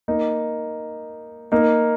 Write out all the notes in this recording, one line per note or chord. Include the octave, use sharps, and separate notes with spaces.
A#3 D#4
A#3 D#4